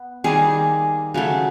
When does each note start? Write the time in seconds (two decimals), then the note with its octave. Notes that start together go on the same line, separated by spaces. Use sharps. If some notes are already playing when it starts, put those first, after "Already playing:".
Already playing: B3
0.24 D#3 G3 A#3 G#4
1.14 C#3 F#3 A3